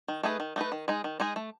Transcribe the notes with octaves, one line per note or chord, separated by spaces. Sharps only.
D#3
A3 D#4 G#4 B4
D#3
A3 D#4 G#4 B4
D#3
G#3 D#4 G#4
D#3
G#3 D#4 G#4
A3